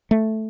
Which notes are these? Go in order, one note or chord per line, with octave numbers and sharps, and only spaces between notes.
A3